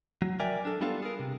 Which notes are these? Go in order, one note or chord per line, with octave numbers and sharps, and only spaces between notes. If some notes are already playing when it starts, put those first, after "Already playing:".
F#3
A#4 D5 E5 G5 G#5
D4 A4
G3 B3 D4 F4 A4 F5
G#4 A#4
C3